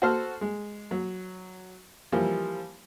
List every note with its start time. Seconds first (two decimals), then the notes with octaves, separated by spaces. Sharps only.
0.02 F#4 A4 C5 A5 F6
0.41 G#3
0.91 F#3
2.12 E3 F3 G3 A#3